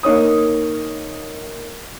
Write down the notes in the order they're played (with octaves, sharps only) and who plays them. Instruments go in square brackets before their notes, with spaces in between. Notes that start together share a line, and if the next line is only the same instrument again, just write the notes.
[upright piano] A#3 D#4 C#5 D#6